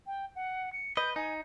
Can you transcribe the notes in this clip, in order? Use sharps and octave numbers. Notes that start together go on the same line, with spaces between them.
G5
F#5
C#7
B4 D#5 G6
D#4 G#5